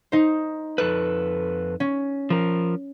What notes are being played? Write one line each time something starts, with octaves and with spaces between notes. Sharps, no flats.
D#4 C5
F2 A4 B4 F#6
C#4
F3 A#4